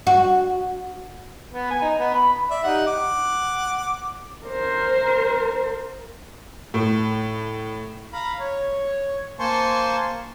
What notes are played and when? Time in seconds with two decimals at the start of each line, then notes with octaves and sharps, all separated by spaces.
0.07 F#4
1.53 B3
1.71 G#5
1.82 D#4
2.00 B3
2.14 B5
2.50 D5 E5
2.63 D#4 G4 F#5
2.87 F#5 D6
4.47 A#4 C5
6.74 A2
8.13 F5 A#5 B5
8.40 C#5
9.39 A#3 C5 G#5 A5 C6 C#6